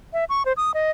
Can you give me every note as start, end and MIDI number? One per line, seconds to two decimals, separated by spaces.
0.13 0.25 76
0.29 0.43 85
0.45 0.53 72
0.57 0.72 87
0.74 0.91 75